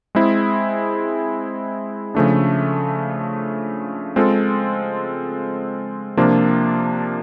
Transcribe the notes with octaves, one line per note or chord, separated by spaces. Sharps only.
G#3 C4 E4 G#4
C#3 F3 A3 D4
G#3 C4 F4 A4
C3 F3 A#3 D4 F4